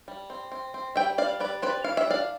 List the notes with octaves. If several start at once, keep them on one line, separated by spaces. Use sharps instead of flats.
G3
C4
C4
C4
G3 E5 G5
G3 D5 F5
G3 B4 D5
C4 B4 D5
E3 F5
E5
D4 D5 F5